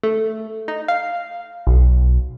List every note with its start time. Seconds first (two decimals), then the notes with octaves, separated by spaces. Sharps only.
0.03 A3
0.68 D#4
0.88 F5
1.67 B1